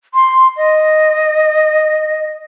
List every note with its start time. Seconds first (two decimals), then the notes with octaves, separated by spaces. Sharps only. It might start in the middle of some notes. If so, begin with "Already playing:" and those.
0.14 C6
0.57 D#5